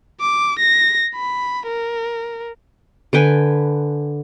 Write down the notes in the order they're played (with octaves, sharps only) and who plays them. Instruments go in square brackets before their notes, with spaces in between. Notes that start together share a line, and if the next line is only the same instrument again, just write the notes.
[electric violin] D6
A#6
B5
A#4
[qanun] D3 B4 G5 G#5